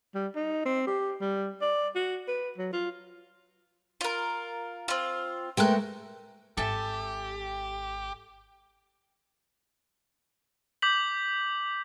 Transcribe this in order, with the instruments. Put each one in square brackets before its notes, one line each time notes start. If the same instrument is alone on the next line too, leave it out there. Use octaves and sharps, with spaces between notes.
[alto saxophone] G3
D#4
C4
G4
G3
D5
F#4
B4
F#3
F4
[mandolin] F4 A#4
C4 F4
[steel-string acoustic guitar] G#3 A3 A#4 [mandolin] G5 F#6
[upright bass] G#1 [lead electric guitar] G4 [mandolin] A4 E5 G#5
[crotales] D6 G6 B6 F#7